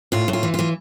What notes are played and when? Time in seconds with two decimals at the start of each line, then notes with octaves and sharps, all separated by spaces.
0.12 A2 F4
0.28 A2
0.33 F4
0.43 E3
0.54 E3 F4